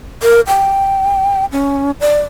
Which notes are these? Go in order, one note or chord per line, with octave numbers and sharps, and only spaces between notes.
A#4
G5
C#4
D5